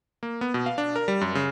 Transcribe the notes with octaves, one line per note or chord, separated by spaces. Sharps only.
A#3
B3
B2
F5
D4
A#4
G3
F#2
C#3